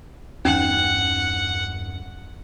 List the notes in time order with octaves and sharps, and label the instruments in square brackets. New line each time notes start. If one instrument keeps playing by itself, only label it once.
[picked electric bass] E2 G2 E3 [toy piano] C#4 D#4 [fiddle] F#5